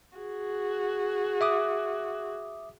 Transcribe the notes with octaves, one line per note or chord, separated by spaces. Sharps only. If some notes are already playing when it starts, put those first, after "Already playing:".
F#4 G#4
E5 D6 D#6